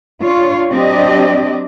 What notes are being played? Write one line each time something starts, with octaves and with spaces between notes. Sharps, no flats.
D4 F4 C#5
F#3 C4 D4 G4 D5 D#5